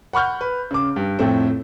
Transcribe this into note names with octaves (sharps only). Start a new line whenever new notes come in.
F#5 B5 C#6 F6 G6
B4
C#3 D6
G2
F2 A2 A3 C4